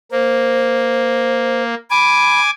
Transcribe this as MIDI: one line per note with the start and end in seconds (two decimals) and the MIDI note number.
0.12 1.75 58
0.12 1.63 72
1.90 2.50 80
1.90 2.41 83
1.90 2.50 86